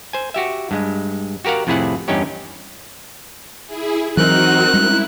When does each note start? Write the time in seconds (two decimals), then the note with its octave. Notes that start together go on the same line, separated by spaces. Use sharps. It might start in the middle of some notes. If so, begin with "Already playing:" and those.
0.13 C5 G#5
0.34 F#4 G4 E5
0.71 G2 G#3
1.45 F#4 G4 A#4 F5 F#5
1.67 F2 A2 C3 E4 G#4 F#5
2.08 E2 G2 C#4 D#4 G4 C#5
3.66 E4 G#4
4.17 E3 F#3 C4 D#4 F#4 A#4 F#6
4.74 G3 G#3 C#4 E4